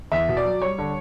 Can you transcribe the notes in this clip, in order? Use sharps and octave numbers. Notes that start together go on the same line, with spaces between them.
E2 E5
B2
D5
F#3
G3 C#5
D3